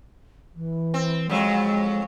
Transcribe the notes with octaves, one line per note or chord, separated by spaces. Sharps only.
E3
C4
F2 F#3 G#3